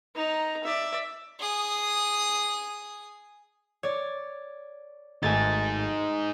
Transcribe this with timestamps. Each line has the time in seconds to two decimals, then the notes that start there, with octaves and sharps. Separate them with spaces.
0.15 D#4 A#5
0.64 D5 E5
1.39 G#4 D#6
3.83 C#5 D5
5.23 G#1 A3 D#4 G#4 G#5 A6